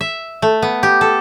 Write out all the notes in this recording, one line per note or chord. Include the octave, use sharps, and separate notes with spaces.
E5
A3
B3
G4
A4